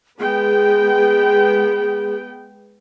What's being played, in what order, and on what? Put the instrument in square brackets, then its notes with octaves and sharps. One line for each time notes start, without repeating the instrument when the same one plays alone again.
[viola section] G#3 B3 G5 [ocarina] G#4